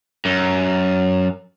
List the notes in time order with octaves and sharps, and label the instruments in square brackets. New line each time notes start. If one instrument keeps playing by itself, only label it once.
[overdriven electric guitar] F#2